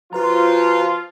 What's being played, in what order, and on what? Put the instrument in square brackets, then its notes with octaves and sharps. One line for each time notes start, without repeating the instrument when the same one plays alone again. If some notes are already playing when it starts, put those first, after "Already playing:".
[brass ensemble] F3 F4 [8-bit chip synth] F#4 B4 A#5